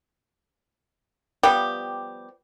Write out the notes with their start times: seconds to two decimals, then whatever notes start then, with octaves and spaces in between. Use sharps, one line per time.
1.43 F3 G3 B3 G4